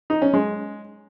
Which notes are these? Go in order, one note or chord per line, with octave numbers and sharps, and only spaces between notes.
D#4
C#4
G#3